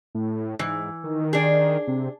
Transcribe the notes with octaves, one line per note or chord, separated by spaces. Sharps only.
A2
G#2 E3
D#3
D4 G#4
C3